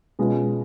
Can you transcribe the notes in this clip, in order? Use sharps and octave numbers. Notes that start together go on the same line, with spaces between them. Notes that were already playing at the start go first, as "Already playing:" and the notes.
B2 G#3 C#4 F4